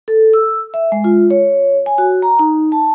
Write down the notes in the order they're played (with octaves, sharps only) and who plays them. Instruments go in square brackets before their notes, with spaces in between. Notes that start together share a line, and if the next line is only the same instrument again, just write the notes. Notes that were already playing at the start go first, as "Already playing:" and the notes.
[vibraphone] A4
E6
E5
G#3
F4
C#5
G#5
F#4
A#5
D#4
A5